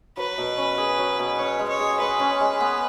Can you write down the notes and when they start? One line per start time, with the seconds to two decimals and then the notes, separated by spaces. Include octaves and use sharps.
0.17 F#3 B4
0.38 B2
0.58 C#4
0.78 G#4
0.98 F#3
1.19 B2
1.38 C#4 C#5
1.59 G#3
1.69 C#5
1.79 G#4
2.00 G#3 B4
2.19 C#4
2.41 G#3
2.60 B3